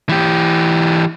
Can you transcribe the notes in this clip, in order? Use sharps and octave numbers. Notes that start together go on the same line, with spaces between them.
E3 G4